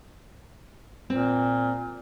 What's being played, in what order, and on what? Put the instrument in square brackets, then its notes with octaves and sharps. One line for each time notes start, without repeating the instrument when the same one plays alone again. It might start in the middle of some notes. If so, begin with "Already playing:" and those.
[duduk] A#2 [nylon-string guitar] C4